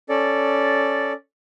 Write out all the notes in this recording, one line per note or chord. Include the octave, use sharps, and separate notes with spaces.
C#4 A4 D5